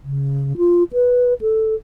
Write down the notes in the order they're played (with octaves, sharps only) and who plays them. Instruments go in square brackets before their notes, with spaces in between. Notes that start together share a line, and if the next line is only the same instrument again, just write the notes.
[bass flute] C#3
F4
B4
A4